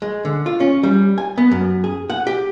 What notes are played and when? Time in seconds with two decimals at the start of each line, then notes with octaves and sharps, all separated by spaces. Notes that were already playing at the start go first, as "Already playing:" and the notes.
0.02 G#3
0.25 D3
0.46 F4
0.60 C#4
0.83 G3
1.18 G#5
1.38 B3
1.51 F#2
1.84 G#4
2.10 F#5
2.27 G4